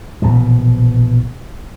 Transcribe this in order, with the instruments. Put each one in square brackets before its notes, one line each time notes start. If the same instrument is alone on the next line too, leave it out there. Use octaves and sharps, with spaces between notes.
[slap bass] A#1 B2 E3